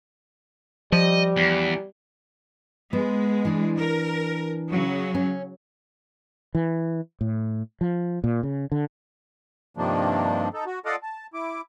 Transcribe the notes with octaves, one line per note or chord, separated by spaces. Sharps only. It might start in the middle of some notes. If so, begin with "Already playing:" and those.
F3 G3 D#5
E2
G#3 B3
E3 D4
A#4
C#3 F#3
C#4
E3
A2
F3
A#2
C#3
D3
G2 C3 D#3 F3 A#3 D4
D#4 A4
F#4
F4 A4 D5 D#5 F5 F#5
A5
E4 D6